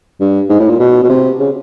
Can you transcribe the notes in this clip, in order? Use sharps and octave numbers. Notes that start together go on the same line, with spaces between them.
G2
G#2
A2
A#2
B2
B2
C3
C#3